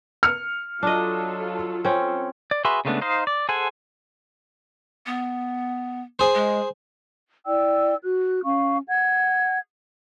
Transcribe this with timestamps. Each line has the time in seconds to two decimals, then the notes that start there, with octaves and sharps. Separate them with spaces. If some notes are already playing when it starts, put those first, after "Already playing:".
0.23 F6 C#7
0.83 F#3 D4 F4 A4 D#5
1.85 C4 C#4
2.51 D5
2.65 F#4 G#4 B4 E5 C6
2.85 C#3 G#3 A3 B3 D4
3.01 D#4 C5 D#5 F5
3.27 D5
3.49 G#4 A4 C5 F#5 G#5
5.06 B3
6.19 G#4 C5
6.35 G#3
7.46 E4 D5 G5 E6
8.03 F#4 F#6
8.43 C#4 F5 C#6
8.88 F#5 G#6